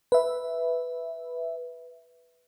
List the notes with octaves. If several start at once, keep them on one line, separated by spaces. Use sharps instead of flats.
B4 E5